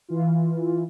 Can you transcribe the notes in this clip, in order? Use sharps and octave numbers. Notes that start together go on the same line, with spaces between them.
E3 F4